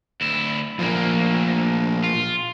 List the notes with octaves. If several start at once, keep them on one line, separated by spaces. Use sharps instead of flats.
D2 E4
D2 A#2 F3 A#3
F4